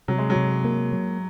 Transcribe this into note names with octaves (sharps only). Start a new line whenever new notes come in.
C3 F#3
G#3
F#3
C3
A#3
F#3